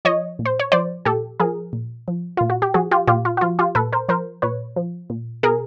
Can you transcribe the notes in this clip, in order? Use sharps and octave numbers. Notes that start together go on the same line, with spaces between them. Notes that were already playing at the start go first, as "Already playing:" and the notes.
F3 C#5 D#5
A#2
C5
C#5
F3 C5 D5
A#2 G4 A4
F3 G#4 A#4
A#2
F3
A#2 F4
F#4
G4
F3 F#4 G#4
F4 G4
A#2 F4 G4
F4
F#4
F3 F4
F4 G4
A#2 A4 B4
A#4 C5
F3 A#4 C5
A#2 B4 C#5
F3
A#2
B2 G#4 A#4